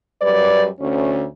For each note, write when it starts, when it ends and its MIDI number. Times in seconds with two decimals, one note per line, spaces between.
0.22 0.67 42
0.22 0.67 55
0.22 0.67 71
0.22 0.67 74
0.80 1.25 38
0.80 1.25 61